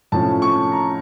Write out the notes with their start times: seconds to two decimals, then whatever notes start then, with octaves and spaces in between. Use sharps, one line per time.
0.12 A2 F3 C#4 A5
0.42 C#6
0.72 A#5